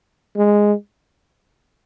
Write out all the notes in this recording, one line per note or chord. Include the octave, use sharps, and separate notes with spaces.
G#3